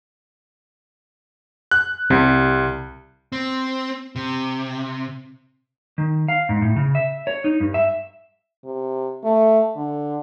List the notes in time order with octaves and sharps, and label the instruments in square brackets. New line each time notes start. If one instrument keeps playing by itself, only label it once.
[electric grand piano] F#6
[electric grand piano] C2 [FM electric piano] C3
[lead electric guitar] C4
C3
[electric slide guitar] D#3
F5
G#2
A2
C#3
E5
C#5
D#4
G2
E5
[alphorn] C3
A3
D3